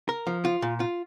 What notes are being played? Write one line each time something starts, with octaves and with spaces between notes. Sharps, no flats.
A#4
F3
F4
A#2
F4